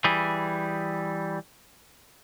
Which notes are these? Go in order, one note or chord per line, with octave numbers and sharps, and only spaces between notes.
E3 G3 G#4